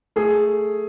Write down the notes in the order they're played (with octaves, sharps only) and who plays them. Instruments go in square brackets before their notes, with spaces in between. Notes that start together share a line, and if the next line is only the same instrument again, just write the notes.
[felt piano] A3 G#4